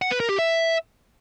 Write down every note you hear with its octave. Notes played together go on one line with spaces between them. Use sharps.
F#5
B4
A#4
G4
E5